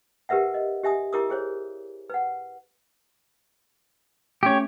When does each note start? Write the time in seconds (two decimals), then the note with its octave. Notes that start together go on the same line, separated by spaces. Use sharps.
0.29 G4 A#4 B4 E5 F#5
0.54 D#5
0.84 G4 E5 G#5 D#6
1.13 E4 G4 A#4 D6 D#6
1.30 G#4 C5 C#5
2.10 B4 F#5
4.43 A3 C#4 G4 C#5